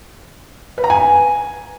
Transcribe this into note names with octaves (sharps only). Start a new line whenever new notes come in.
B4
A#5
G#5